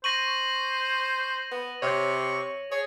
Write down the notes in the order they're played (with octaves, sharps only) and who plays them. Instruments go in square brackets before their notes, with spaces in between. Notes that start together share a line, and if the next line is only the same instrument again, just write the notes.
[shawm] C5 [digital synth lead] C#6 [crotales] A#6 D#7 F#7
[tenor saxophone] B3
[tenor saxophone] C3 [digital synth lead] C#5 [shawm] C#6
[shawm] G#4 [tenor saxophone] C#5